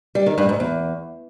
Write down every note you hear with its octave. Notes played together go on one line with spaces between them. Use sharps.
G3
D#3
G2
G#2
E2